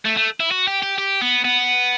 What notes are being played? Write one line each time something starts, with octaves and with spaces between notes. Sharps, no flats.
A3
A3
E4
F#4
G4
G4
G4
B3
B3